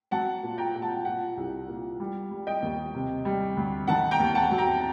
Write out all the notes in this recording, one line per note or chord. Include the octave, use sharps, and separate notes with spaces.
F#3 F#5 A5
A#2
G5 A#5
A#2 G5
F#5 A5
A#2 F#5
C2
A#2
G3
G3
D#5 G5
D#2
C3
G3
D2
D#3 F#5 A5
G5 A#5
D#2
F#5 A5
F#3
G5 A#5